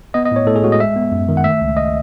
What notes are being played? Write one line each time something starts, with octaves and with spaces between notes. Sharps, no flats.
B3 D#5
D#5
A2 C#5
A2 A4
G#4
G#3 F#4
D#5
G#3 E5
B3
F#2
D#3
F#5
A3 E5
C#2
D#5